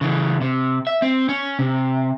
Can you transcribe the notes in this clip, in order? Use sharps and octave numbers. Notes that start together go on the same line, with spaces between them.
C#3 E3
C3
E5
C4
C#4
C3